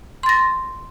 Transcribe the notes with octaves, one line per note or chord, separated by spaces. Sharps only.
C6 A6 A#6